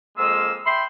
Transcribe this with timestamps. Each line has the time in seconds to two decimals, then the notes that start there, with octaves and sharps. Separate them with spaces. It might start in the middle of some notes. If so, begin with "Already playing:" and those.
0.18 F2 G#3 A#3 F4 E6
0.66 E5 G5 B5 C6